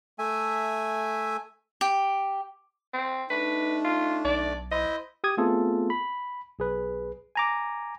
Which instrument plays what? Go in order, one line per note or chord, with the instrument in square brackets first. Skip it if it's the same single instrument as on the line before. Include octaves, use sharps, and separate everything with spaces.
[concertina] A3 E5 G#5
[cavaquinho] G4
[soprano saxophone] C4
[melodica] A3 D4 [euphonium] D#4 [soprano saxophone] B4
[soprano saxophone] F4
[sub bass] B1 [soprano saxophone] D5
[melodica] E4 C5 E5 [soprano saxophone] D#5
[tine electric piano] G4 D#6 G#6
A3 B3 C4 F4 G#4 A4
B5
B1 G#4 B4
G#5 A#5 D6